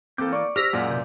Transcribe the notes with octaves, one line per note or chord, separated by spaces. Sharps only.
E3 A#3 C4 A4 D6 G6
D5 C#6 D6
G4 C5 E6 F6 A#6 B6
F#2 A#2 G#3 D5 F#5
C3 B4 G6